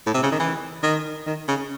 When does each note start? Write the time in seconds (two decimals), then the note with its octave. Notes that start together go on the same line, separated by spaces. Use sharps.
0.06 A2
0.14 C3
0.23 C#3
0.32 D#3
0.40 E3
0.83 D#3
1.27 D#3
1.48 C#3